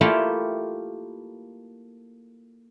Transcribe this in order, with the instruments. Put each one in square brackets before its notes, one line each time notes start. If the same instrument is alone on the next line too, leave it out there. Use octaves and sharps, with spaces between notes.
[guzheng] A3 A#3 E4 F4 G4